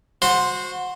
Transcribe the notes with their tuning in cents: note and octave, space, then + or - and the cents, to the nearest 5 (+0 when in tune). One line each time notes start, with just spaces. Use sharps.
F#4 -25 C5 +0